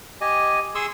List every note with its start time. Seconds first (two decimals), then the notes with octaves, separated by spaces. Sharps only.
0.21 G4 D#5 G#5
0.75 G#4 C6 C#6 D#6 E6